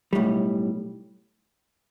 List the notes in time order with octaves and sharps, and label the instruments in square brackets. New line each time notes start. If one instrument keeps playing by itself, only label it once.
[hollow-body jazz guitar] B1 A2 G3